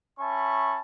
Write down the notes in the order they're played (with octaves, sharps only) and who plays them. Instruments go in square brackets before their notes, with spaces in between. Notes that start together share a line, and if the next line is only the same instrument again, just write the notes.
[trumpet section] C#4 E5 A5 B5 C#6